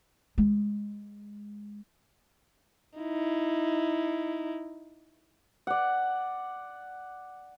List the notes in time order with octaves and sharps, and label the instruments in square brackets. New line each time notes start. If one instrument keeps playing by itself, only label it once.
[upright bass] G#3
[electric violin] D#4 E4
[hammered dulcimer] D5 F#5